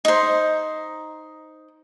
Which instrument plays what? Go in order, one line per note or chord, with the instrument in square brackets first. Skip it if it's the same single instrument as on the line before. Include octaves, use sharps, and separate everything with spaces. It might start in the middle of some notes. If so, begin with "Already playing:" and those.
[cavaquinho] D#4 C5